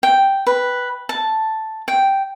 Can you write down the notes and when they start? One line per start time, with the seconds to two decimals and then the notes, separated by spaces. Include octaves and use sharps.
0.03 G5
0.47 B4
1.09 A5
1.88 G5